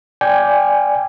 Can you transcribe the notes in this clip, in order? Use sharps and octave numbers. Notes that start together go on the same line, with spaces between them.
D5 G5 G#5